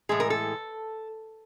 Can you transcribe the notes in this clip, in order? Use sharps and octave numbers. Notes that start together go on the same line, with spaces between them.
A2 E3 G#3 G#4
A#4
A4